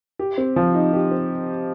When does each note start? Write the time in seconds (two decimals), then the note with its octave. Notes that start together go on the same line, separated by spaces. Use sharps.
0.19 G4
0.38 C4
0.56 F3
0.74 D#4
0.93 G4
1.11 C4